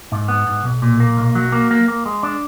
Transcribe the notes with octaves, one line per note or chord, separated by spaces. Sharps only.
G#2
B3
G#2
B1
A#2
A#3
B1
F#3
A#3
A#3
A#3
G#3
D4